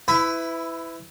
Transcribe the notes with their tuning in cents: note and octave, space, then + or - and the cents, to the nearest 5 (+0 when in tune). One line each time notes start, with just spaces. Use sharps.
E4 +0 B4 +30